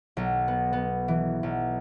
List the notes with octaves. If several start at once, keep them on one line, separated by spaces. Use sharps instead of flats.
B1
B3
B3
E3
B1